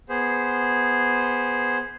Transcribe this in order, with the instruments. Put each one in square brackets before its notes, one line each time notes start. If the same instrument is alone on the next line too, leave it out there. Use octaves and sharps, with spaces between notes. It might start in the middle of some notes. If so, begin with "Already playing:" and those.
[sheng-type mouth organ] B3 G#4 C5